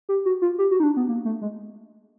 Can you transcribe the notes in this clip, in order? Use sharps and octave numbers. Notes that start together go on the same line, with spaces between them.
G4
F#4
F4
G4
F#4
D#4
D4
B3
A#3
A3
G#3